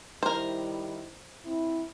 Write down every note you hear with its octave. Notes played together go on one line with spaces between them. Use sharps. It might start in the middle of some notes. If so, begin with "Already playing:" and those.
D#3 G3 E4 A#4 C5
C4 E4